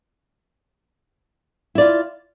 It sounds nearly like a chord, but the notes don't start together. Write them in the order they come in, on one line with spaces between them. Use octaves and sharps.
E4 D5 F4